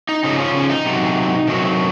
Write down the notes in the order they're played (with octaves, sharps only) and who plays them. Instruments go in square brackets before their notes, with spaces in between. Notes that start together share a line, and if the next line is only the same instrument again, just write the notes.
[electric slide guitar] D#4
C#3 F3 D#4
C#4
C#4
D#4
C3 F#3
C3 D#3 F#3